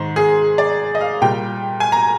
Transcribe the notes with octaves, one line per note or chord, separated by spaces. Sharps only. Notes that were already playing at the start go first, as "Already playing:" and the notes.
Already playing: G#2 D#3 C5
G#4
D5
D#5
F5
A#2 G3 G5
G#5
A#5